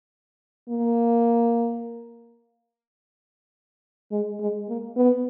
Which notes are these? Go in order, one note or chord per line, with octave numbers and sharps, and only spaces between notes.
A#3
G#3
G#3
A#3
B3